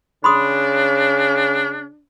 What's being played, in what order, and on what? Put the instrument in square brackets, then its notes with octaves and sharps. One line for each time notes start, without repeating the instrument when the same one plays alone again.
[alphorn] C#3 [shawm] D4 [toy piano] B5 C6 D#6